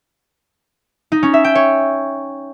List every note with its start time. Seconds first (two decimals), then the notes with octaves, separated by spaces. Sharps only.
1.12 D#4
1.23 C#4
1.34 E5
1.44 G5
1.55 C#5